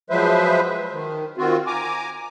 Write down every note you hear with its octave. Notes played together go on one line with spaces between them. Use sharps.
F3 F#3 G#3 B4 C5 E5
D#3
D#3 C4 F4 F#4
G#5 A#5 D6